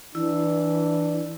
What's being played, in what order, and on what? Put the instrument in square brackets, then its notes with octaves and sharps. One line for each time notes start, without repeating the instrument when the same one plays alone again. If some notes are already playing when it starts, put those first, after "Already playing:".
[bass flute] E3 [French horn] D4 [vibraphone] E4